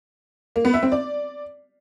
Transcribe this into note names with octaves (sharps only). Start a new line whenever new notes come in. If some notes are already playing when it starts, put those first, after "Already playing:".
A#3
B3
E5
C4
D5